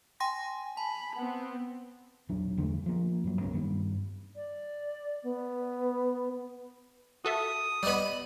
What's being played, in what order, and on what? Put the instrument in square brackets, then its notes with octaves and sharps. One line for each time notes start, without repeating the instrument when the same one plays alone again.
[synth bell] G5 C6 A#6 [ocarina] G#5
[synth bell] A5 [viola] B5
[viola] B3 C4 [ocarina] F#5
[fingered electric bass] E1 A#1 F#3 D4
E2 D3 G3 A3
F3 A#3
G2 F#3
G1 C#2 A#3 C#4
G2 D#3 G3
[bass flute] D5
B3
[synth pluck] F#4 A4 E5 [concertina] D#6
[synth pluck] G3 B3 [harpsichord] D5 D#5 B5